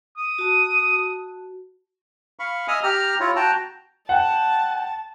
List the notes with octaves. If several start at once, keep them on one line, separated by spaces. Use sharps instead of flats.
D#6
F#4 A5
F5 B5 C#6
D#5 E5 G#5 D#6 F6
G4 A#5 F6
E4 F4 C#5
F#4 G5 A5 A#5
F#5 G5 A5